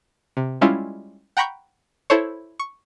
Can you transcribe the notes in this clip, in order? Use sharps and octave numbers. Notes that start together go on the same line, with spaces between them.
C3
G3 G#3 C#4 E4 F4
F#5 G5 A#5 B5 C#6 G6
E4 A4 C5 C#5
C#6